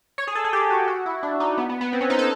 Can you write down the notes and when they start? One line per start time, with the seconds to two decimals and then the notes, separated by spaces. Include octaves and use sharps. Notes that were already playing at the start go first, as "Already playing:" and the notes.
0.18 C#5
0.27 G#4
0.35 A4
0.45 G#4
0.53 G4
0.70 F#4
0.88 F#4
1.06 E4
1.23 D4
1.40 D#4
1.58 B3
1.69 B3
1.81 B3
1.93 C4
2.01 C#4
2.10 D#4
2.19 A4